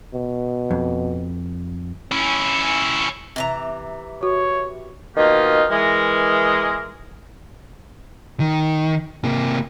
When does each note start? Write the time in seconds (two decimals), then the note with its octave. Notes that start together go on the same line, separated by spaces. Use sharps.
0.14 B2
0.71 F2
2.12 C#4 E4
3.36 C3 E3 A#5
4.23 F#4 C#5
5.16 B2 D#3 A#3 D#4 F4 G4
5.70 E3 G#3 A#4
8.40 D#3
9.24 C3 A#3